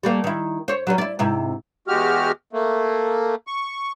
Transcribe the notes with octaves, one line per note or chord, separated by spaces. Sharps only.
G3 A3 A#3
D#3 E4
C5 C#5
F#3 G3 C#4
E4 D5
G#2 C3 E4
E2 G#3 F#4 G4 F6
A3 A#3
C#6